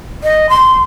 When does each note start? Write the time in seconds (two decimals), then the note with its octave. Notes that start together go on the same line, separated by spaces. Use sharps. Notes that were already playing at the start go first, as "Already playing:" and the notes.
0.23 D#5
0.50 C6